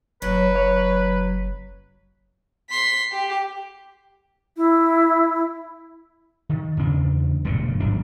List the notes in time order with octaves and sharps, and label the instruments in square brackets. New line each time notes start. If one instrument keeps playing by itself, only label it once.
[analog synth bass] F#1 [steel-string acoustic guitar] F#3 [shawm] B4
[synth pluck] C#5
[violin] C6 B6
G4
[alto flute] E4
[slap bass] D#3
E2 C#3 D4
E1 G2 A#2 D3
D#1 G#1 F#2 D4